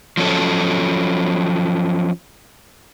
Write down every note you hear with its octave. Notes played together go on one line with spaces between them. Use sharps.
F3 F#3 C#4 A4